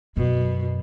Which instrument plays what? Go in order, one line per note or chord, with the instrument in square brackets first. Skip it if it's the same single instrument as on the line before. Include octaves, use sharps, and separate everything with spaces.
[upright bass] F#2 [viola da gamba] B2